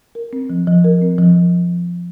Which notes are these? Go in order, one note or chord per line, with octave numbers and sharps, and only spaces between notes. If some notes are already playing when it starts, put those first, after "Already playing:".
A#4
C4
F3
F3
A#4
C4
F3